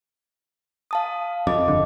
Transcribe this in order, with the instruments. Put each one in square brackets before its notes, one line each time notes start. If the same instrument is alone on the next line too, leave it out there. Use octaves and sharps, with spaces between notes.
[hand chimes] F5 A5 D#6
[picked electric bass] F2 [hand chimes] D#5 D6
[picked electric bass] G1 D3